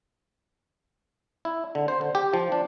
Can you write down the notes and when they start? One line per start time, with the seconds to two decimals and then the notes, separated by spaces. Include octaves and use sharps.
1.45 E4
1.75 D3
1.88 C5
2.01 D3
2.15 G4
2.34 F3
2.52 D4